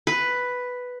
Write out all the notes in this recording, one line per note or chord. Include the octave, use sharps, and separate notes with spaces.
B4